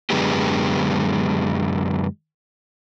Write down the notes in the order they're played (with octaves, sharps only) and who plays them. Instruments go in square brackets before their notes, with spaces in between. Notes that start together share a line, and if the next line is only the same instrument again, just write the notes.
[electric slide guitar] F#2 D3 G#3 B3 G4